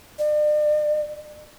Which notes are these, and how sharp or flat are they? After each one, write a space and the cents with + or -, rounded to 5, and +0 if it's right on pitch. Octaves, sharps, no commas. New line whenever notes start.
D5 +40